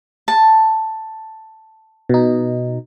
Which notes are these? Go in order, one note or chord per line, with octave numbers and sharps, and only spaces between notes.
A5
B2 D#4